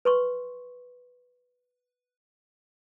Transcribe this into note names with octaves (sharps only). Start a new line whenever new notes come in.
B4 C6 C#6